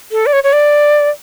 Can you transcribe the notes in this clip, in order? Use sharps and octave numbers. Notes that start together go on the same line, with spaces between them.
A4
D5
C#5
C#5
D5